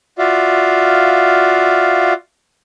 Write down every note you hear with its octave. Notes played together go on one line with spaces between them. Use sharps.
F4 F#4 D5 E5 F5